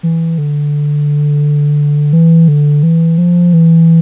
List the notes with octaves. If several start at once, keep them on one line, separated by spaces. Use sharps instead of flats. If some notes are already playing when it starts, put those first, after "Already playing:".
E3
D3
E3
D3
E3
F3
E3